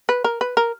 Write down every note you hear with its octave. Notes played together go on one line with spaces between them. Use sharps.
B4
A#4
B4
A#4